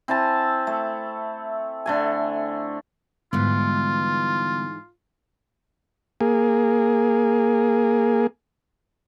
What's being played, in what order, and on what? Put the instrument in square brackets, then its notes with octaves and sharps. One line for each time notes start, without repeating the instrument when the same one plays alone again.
[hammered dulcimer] C4 E4 G#5 A5
A3
D3 A3 G#5
[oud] G#2 E3 [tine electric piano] D3 G3 B3 [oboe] F4
[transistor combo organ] A#3 G#4